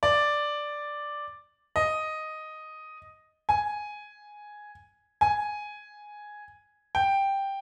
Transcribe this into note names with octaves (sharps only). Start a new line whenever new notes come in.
D5
D#5
G#5
G#5
G5